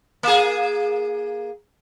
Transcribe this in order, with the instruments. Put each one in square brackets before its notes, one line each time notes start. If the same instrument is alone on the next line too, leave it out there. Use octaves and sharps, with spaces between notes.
[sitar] A#3 G#4